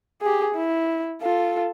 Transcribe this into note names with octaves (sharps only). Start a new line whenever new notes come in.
G4 G#4
E4
F4 A4